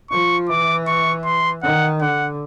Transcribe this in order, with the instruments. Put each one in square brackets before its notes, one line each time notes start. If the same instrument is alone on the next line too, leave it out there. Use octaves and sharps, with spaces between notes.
[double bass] F3 [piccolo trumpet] C#6
[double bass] E3 [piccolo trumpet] D6
[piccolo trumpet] C#6
C6
[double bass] D#3 [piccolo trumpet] F#5
[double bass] D3 [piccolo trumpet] F#5